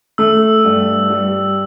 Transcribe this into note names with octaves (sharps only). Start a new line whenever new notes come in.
A3 E6
G2
G3